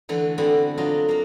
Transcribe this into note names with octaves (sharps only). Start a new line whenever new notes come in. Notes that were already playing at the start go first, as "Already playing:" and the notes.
D3 E3 A3
D3 B3 C4 F#4
F#3 D4 F4 D#5
A#3 A#4